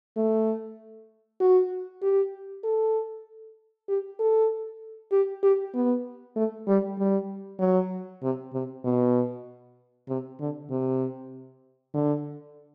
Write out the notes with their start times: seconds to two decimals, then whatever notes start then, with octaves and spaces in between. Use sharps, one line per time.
0.16 A3
1.41 F#4
2.02 G4
2.64 A4
3.89 G4
4.20 A4
5.12 G4
5.43 G4
5.74 B3
6.36 A3
6.67 G3
6.99 G3
7.60 F#3
8.23 C3
8.54 C3
8.85 B2
10.09 C3
10.40 D3
10.70 C3
11.94 D3